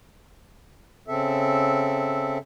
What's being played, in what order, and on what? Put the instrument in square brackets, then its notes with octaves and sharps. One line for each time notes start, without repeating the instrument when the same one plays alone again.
[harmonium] C#3 C4 A4 E5